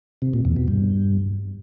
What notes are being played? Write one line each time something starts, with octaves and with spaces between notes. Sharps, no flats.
C3
A#2
E2
B2
G2